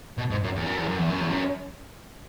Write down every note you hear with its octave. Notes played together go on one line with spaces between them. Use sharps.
B2
G#2
F#2
E2
F#2
E2
F#2
E2
F#2
E2
F#2